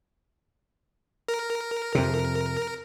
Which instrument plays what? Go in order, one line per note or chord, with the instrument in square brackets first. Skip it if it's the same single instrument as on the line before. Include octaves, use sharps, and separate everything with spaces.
[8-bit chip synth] A#4
[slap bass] F2 C3